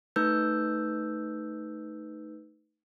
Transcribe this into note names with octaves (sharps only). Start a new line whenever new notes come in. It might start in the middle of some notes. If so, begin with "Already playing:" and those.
A3 D#4 B4 E6 G6